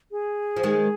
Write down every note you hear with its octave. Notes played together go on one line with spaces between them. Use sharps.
G#4
F3
D#3 G#3